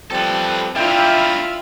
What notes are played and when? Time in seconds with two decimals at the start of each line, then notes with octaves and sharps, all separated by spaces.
0.11 F3 G3 C4 A4 B4
0.76 D4 E4 F4 A#4 E5 G5 B5 F6